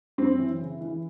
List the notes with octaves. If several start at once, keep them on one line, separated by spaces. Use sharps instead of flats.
F#2 C4
E3
C#3
E3